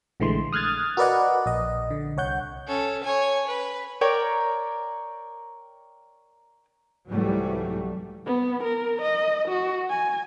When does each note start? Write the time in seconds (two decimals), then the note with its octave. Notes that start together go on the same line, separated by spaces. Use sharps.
0.20 A#1 D3 E3 G#3 A3 C6
0.53 D#6 F6 F#6 G#6 A6
0.97 F#4 A#4 B4 D5 D#5 F#5
1.46 A#1 D#5
1.90 D3
2.17 C2 C#5 F#5 G6
2.67 C#4 A4
3.03 C#5 G#5
3.46 B4
4.01 A#4 C#5 D5 G5
7.10 C2 G#2 E3 F#3 G3 A3
8.26 B3
8.64 A#4
9.02 D#5
9.48 F#4
9.90 G#5